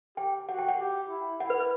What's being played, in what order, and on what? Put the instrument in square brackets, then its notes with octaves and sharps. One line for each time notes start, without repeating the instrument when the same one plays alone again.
[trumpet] G4 [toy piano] G5
[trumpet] F#4 [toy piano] F#5
[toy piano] G5
F#5
[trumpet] G4
E4
[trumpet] E4 [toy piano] F#5
[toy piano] B4
B4